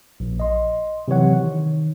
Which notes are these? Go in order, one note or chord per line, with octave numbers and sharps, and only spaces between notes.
A#1
D#5 C6
C3 E3 F#3 C#5 F#5
D#3